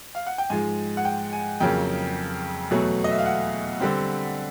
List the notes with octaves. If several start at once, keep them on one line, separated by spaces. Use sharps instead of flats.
F5
F#5
G5
G#2 F3 G#3 G#5
F#5
G5
G#5
F2 C#3 F#3 A#3 G5
E2 B2 F#3 A3
D#5
E5
F5
F#5
D3 G3 C4